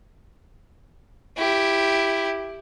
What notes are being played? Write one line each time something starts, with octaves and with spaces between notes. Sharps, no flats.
E4 G4